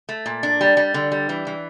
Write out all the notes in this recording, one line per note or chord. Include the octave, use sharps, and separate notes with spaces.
A3
A#2
D4
G3
G3
D3
G3
E3
E3